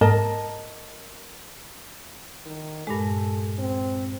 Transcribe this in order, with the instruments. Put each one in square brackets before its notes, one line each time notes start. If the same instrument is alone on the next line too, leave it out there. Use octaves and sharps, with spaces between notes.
[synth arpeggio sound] G#2 [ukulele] A#4 D#5 A5
[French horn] D#3
[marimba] G2 A#2 G#3 [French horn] A4
[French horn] C4